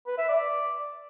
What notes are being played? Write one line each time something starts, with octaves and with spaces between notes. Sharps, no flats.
B4
E5
D5